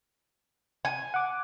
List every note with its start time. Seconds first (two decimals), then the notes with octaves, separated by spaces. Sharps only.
0.85 G#5
1.14 F#5 D6